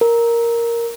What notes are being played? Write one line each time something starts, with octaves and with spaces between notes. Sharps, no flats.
A#4